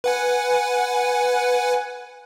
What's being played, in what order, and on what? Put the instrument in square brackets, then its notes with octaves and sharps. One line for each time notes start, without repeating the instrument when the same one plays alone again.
[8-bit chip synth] B4 F#5 G#5